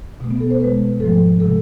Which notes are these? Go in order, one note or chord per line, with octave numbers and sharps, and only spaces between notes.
B2 A3
B3
A4
C5
B2 G#3 B4
G#2 F3 A3 A4
C3 G#3 A4